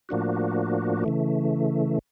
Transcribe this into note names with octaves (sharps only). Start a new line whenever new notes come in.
A2 F3 A#3 D4 F#4
C#3 E3 A3